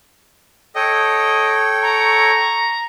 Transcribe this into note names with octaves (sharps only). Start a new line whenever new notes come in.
A4 C#5 D#5 G5
A#5 C#6